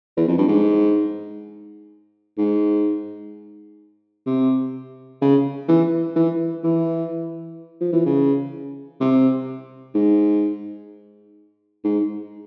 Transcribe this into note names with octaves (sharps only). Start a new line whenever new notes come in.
E2
F2
G2
G#2
G#2
C3
C#3
E3
E3
E3
F3
E3
C#3
C3
G#2
G#2